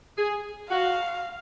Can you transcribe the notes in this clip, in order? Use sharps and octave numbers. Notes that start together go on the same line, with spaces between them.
G#4
F#4 F5